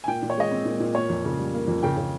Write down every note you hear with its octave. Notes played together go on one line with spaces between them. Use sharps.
G#5
A#2 G5
A#2
C#5
G#3 D#5
C4
A#2
A#2
A#3 C#5
F2
C#3
G3
A#3
F2
C#3 G5
C#3